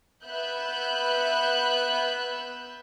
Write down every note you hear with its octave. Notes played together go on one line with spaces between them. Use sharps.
B3 B4 E5 F#6 G6